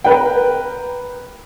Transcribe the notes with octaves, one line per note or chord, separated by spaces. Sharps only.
A#4 B4 G5